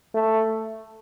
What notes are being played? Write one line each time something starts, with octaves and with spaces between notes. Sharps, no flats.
A3